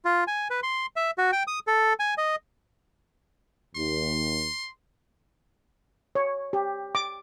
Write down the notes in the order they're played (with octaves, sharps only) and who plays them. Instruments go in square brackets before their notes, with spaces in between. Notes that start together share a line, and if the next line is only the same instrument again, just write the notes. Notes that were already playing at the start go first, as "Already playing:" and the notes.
[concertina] F4
G#5
B4
C6
E5
F#4
G5
D#6
A4
G#5
D#5
[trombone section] D#2 [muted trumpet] C6
[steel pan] C#5
G4
D6